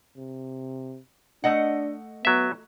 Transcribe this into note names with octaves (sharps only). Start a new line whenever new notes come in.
C3
A3 D4 D#5 F#5
F#3 B3 E5